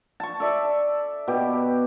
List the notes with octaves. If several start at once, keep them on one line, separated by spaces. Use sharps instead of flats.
A5 C#6
A4 D5 E5
B2 G4